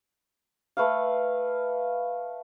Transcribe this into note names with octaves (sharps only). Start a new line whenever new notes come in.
A3 B4 F5